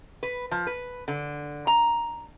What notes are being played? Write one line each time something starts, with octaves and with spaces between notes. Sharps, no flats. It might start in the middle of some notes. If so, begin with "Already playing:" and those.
B4
F3
B4
D3
A#5